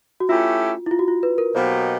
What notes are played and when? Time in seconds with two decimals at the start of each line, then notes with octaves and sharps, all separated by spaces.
0.20 F#4
0.29 A3 C#4 E4 F4 G4
0.86 E4
0.91 F4
0.99 F#4
1.08 F4
1.23 B4
1.38 A#4
1.55 B2 F#3 A#3 D#4 G4 C5